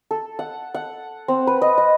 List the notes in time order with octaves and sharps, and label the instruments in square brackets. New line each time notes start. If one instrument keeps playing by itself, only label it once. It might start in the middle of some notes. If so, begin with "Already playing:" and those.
[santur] A4
F#5
F#5
C4
B4
D#5
D#5